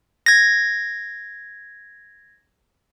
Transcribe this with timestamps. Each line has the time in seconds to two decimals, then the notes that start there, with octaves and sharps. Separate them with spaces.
0.26 G#6 A#6